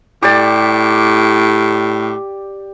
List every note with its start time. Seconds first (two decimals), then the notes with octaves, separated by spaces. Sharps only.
0.23 A2 G4 D5